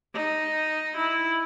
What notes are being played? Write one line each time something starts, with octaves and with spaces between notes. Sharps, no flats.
D#4
E4